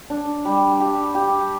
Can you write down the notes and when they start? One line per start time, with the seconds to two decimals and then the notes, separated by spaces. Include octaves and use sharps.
0.10 D4
0.45 G3
0.80 G4
1.15 G4